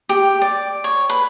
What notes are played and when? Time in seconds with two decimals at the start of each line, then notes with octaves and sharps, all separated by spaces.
0.09 G4
0.42 D5
0.84 C#5
1.10 B4